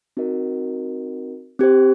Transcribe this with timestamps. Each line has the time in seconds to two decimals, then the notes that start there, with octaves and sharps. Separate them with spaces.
0.17 C4 D#4 F#4 A#4 D#5
1.59 C4 G4 C5